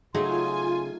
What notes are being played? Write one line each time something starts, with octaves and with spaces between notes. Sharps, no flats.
C#3 F#3 A3 D#4 F4 G#4 G#5 C6